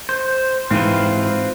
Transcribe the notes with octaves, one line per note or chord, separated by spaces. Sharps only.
C5
G#2 E3 C4 F4 B4